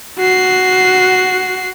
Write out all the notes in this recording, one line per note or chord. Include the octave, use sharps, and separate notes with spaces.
F#4 C7